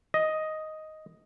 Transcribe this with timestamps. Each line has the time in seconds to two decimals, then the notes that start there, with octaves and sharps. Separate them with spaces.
0.14 D#5